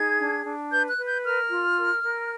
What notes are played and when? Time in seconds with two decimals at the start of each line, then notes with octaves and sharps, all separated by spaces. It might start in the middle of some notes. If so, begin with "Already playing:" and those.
Already playing: D#4 G#4 G#6
0.19 D4
0.45 D4
0.71 B4 G6
0.90 F#6
0.98 B4
1.07 G6
1.24 A#4 F6
1.51 F4
1.78 A#4
2.03 A#4